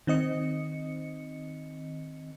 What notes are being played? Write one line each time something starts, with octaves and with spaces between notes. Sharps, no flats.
D#3 C4 D#5 C#7